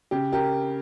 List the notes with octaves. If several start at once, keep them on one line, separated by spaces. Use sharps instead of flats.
C#3 G4
G4 A#4